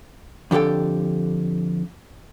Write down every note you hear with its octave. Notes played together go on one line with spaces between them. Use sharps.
F2 D3 G4 A4 G5